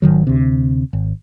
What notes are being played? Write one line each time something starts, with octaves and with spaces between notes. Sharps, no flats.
G#1 C#2 D#3 F#3
D2 C3
G#1